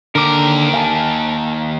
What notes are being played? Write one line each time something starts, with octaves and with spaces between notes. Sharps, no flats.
D#2 D3 A#4 D6
F5 G#5 A5